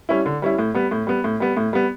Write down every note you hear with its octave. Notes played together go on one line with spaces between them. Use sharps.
G3 C#4 E4
D3
G3 C#4 E4
A2
G3 B3
A2
G3 B3
A2
G3 B3
A2
G3 B3